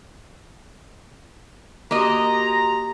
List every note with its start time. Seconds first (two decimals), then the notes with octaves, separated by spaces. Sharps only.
1.91 A#3 F#4 G4 D#5 A#5 C6